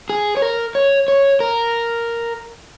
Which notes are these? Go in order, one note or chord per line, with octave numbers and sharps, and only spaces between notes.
G#4
C#5
A#4
C#5
C#5
A#4